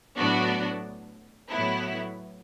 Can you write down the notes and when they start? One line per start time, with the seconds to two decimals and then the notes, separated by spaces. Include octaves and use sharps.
0.18 A2 F#3 B3 D4 F#4
1.49 A2 F#3 B3 E4